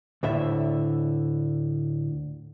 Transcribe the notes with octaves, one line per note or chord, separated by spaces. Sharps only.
D2 A2 D3 E5